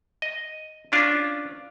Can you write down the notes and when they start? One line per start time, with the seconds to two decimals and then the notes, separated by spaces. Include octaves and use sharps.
0.22 D#5
0.92 C#4 D4 F4